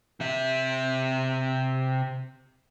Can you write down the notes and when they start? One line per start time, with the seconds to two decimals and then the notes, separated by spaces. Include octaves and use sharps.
0.20 C3 E5